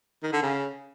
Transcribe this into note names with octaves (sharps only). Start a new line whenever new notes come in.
D#3
D3
C#3